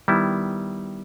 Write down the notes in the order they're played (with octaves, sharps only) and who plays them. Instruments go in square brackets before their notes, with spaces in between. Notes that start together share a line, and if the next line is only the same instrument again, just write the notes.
[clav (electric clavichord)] D#3 G3 B3 E4